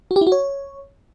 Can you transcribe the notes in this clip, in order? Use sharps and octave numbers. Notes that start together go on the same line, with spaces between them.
F#4
G4
E4
F#4
C#5